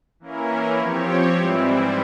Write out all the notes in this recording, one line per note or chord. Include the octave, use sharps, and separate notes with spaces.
E3 A#3 C#4 E4 A#4
F3 C4 G4 C#5
G#2 E3 G3 C4 E4